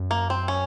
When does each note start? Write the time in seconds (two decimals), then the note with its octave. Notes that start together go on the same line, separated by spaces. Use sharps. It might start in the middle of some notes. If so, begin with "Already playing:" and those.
Already playing: F#2
0.11 A#3
0.30 C4
0.48 C#4